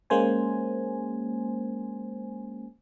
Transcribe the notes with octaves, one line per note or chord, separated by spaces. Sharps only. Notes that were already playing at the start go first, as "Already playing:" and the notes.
G#3 A#3 C#4 C5 G#5